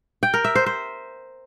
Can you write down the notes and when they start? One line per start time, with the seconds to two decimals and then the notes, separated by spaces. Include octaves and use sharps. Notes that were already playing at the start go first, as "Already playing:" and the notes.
0.23 G5
0.34 A#4
0.45 E5
0.55 C5
0.66 C5